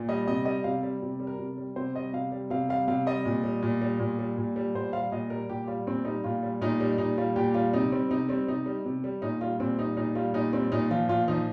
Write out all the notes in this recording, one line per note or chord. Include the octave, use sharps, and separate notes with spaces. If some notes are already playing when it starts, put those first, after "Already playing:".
Already playing: A#2
G3 D#5
C3 D#5
G3 D#5
C3 F5
G3
C3
G3
A#4
C3
G3
C3 C5
G3 D#5
C3 F5
G3
C3 F5
G3 F5
C3 F5
G3 D#5
A#2
G3
A#2
G3
A#2
G3
A#2
G3
A#2 C5
G3 F5
A#2 D#5
G3 A#4
A#2 G4
G3 F4
A#2 C4
G3 D#4
A#2 F4
G3
A#2 D#4
G3
A#2 D#4
G3 F4
A#2 G4
G3 F4
C3 D#4
G3 C4
C3 D#4
G3 C4
C3 D#4
G3
C3
G3
A#2 D#4
G3 F4
A#2 C4
G3 D#4
A#2 D#4
G3 F4
A#2 D#4
G3 C4
A#2 D#4
F3 F4
A#2 F4
F3 D#4